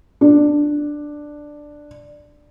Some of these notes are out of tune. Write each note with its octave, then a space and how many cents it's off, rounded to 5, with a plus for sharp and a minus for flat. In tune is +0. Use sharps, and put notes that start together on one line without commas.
D4 +5